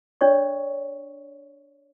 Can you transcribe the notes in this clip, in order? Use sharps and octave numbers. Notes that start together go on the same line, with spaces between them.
D4 C#5 D5 C#6